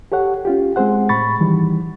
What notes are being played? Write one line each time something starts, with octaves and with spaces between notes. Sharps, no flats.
G4 A4 C#5 F#5
C#4 F4 G4
G#3 C4 G#4 C5 F#5
A2 B5 C#6 A6
D#3 E3 G3